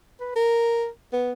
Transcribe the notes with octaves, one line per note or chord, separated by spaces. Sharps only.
B4
A#4
B3